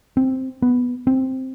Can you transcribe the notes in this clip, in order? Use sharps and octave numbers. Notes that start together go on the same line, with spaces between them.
C4
B3
C4